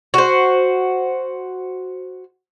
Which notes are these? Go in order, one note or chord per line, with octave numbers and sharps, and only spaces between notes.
F#4 C5